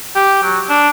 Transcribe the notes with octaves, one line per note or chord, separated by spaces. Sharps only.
G4
F#3
D4